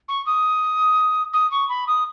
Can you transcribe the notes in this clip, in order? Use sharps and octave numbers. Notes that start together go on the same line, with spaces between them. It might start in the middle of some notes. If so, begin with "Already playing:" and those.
C#6
D#6
D#6
C#6
B5
D#6